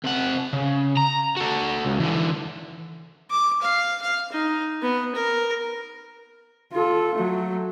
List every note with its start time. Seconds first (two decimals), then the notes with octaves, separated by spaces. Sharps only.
0.04 C3 F#5
0.53 C#3
0.97 A#5
1.37 F#4 A4
1.85 C#2
2.00 D3 E3
3.30 D6
3.62 F5
4.02 F5
4.32 D#4
4.82 B3
5.15 A#4
6.73 F4 A4
7.15 F#3 A3